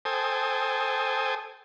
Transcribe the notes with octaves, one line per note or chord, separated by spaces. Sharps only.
A4 C5 G5 G#5 D#6